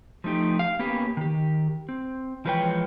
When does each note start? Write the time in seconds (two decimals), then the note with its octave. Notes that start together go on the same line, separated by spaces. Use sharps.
0.24 F3 A3 D#4 G4
0.59 F5
0.79 A#3 B3 C#4 G4
1.17 D#3 G4
1.89 C4
2.45 E3 F3 G#3 B4 C#5 G5